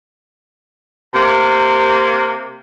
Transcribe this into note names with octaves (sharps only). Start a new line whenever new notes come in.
C3 A#3